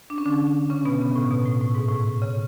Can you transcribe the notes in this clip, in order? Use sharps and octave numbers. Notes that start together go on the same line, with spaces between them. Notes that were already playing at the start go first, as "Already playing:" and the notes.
D4
C#4
D3 D4
C#3 C#4
B2 B3
C#3
A2
B2
A2
A2
G#2
A2
C#3